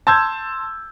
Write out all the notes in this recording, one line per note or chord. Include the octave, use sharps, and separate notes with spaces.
A5 C6 E6 G6 G#6